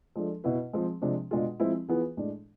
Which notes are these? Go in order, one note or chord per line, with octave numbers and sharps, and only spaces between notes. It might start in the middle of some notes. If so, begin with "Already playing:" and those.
F3 G#3 D4 A4
B2 B3 E4 B4
F3 G#3 C4 G#4
C3 F3 G#3 D4
B2 G#3 D4 F4 G#4
F3 G#3 C4 E4
E3 B3 F4 G#4 B4
A2 G#3 D4